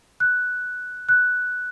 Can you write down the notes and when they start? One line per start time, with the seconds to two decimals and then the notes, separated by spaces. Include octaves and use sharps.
0.20 F#6
1.09 F#6